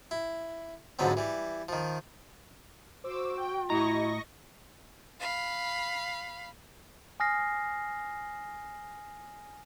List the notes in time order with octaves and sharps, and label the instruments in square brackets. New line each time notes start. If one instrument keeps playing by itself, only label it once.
[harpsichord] E4
F2 G#2 D3 F#3 B3 C4
E3 G3
D#3 F3
[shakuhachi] F#4 [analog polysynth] C5 D6 E6
[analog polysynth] G5
[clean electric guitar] A2 A#5 [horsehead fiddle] E4 [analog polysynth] D#5 C#6 A#6
[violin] F5 B5
[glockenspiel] G#5 D#6 F6 A#6 C7